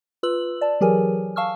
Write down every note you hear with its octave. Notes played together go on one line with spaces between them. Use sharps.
F4 B4 E6 F#7
D5 A5
E3 F#3 G4 G#4 A#4 G#5
F5 A5 C#6 E6 F6